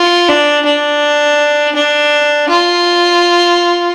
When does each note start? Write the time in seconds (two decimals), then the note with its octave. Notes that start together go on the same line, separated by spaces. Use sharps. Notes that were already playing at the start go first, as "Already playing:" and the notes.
Already playing: F4
0.29 D4
0.66 D4
1.75 D4
2.49 F4